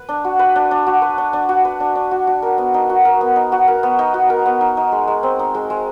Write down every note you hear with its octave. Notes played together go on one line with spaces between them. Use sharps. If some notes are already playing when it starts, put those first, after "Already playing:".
Already playing: B4
D4
F#4
B4
D4
D4
F#4
B4
D4
D4
F#4
B4
D4
D4
F#4
F#4
A#4
B3
D#4
F#4
A#4
B3
D#4
F#4
A#4
B3
D#4
F#4
A#4
B3
D#4
D#4
G#3
G#3
C4
D#4
G#3
G#3